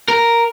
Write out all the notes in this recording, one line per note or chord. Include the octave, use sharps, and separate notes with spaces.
A#4